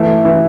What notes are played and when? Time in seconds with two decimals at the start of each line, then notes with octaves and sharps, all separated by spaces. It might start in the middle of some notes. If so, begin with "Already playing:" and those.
Already playing: E3 A3
0.25 E3